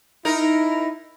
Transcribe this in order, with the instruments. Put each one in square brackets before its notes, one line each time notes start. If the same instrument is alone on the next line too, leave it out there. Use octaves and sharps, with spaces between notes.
[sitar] D#4 A#4 [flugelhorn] E4